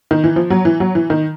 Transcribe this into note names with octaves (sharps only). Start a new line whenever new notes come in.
D#3
E3
F3
F#3
E3
F#3
E3
D#3